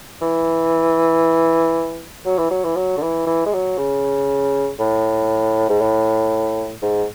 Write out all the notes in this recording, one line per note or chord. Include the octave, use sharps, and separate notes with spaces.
E3
F#3
E3
F#3
E3
F#3
D3
E3
E3
G#3
F#3
C#3
A2
G#2
A2
G#2